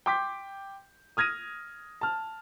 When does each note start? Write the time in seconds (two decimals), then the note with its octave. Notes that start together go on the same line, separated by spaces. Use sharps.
0.06 G5 C6 D6 G6 B6
1.17 D#6 F6 G#6 A#6 D#7
2.01 A5 F6